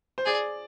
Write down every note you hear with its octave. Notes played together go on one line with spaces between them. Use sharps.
C5
G#4 D5